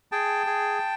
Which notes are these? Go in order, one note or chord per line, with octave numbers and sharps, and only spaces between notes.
G#4 G5 A5
G#4